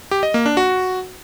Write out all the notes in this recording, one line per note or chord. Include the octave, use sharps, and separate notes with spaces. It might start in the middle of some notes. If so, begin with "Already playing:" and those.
G4
D#5
A#3
D4
F#4